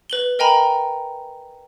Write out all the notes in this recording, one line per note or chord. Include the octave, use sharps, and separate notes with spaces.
B4 F#7 G7
A#4 D#5 G5 G#5 A#5 B5